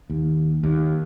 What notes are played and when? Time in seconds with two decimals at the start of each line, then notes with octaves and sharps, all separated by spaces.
0.10 D#2
0.63 D#2